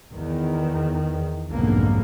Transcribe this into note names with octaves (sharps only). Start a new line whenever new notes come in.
E2 D#3
B1 F2 G#2 D3 A#3 B3